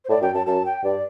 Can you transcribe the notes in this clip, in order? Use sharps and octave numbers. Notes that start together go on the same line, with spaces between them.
C5
A2 D5
F#2 G5
F#2 A5
F#2 A5
G5
G2 D5